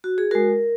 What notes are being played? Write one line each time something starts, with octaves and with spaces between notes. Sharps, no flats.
F#4
G#4
G#3 F#4 A#4